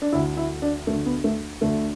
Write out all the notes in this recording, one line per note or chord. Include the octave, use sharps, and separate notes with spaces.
D4
D2 D3 E4
E4
D4
D2 D3 A3
B3
A3
D2 D3 A3